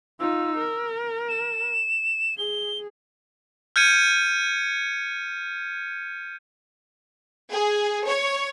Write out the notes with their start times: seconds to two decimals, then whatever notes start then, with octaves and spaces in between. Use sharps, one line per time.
0.20 D#4 F4 E6
0.57 A#4
1.29 E7
2.38 G#4 G7
3.76 F6 G6 G#6 C#7 D#7
7.52 G#4
8.06 C#5